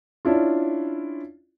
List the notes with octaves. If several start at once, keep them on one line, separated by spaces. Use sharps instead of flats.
C#4 D4 E4 F4